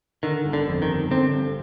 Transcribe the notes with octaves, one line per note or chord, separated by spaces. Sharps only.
D3 D#3
G1
D3
F2
D#3
G1
D3 C4
G1